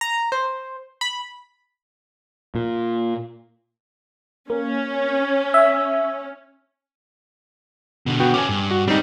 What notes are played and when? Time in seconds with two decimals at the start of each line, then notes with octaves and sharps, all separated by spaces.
0.01 A#5
0.32 C5
1.01 B5
2.55 A#2
4.50 A#3 C#4
5.54 E5
8.06 B2 D3
8.20 B3 F#4 G5
8.34 C#4 A4 G#5 D6
8.49 G2
8.71 F#4
8.88 G3 G#3 C4 D#4